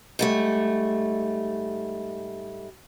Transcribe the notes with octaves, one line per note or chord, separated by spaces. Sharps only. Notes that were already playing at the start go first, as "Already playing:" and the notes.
G#2 G3 A3